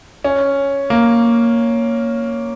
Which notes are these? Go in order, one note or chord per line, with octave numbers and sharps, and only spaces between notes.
C#4
A#3